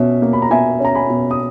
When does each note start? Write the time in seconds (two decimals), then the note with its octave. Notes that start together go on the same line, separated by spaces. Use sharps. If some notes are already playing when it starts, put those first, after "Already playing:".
Already playing: B2 C#4 E5
0.22 A#3
0.33 B5
0.42 A#5
0.50 B2 E5 G#5
0.80 C#4 A#5
0.95 G#5 B5
1.10 B2
1.31 D#6